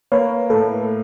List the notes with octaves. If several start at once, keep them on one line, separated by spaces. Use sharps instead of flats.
A#3 B4 C#5
A2 A4 B4